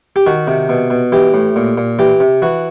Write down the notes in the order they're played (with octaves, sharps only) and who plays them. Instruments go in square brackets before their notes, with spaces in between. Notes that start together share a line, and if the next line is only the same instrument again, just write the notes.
[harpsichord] G4
D#3 F#4
C3
B2
B2
E3 G4
A2
A#2
A#2
E3 G4
C3
E3 F#4